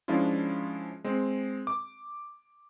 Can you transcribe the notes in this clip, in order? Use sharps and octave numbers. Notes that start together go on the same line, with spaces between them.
F3 G#3 C#4 D4 E4 F4
G#3 C4
D6